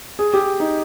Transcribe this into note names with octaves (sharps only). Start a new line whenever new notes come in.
G#4
G4
D#4